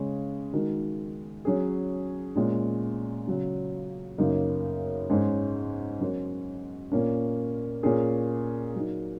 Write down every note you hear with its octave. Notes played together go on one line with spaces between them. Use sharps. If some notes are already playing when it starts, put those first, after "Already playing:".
Already playing: C#3 G#3 C#4 G#4
D#3 G#3 D#4 F#4 A#4
F#3 C#4 G#4
A#2 G#3 C#4
C#3 F#3 C#4
F#2 C#3 A#3 D#4
G#2 G#3 C#4
F#3 C#4 F#4 A#4
A#2 A#3 C#4
A#2 A#3 C#4 G#4
F#3 A#3 D#4